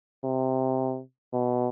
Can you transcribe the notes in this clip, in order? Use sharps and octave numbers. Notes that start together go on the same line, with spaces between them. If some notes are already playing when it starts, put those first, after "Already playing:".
C3
B2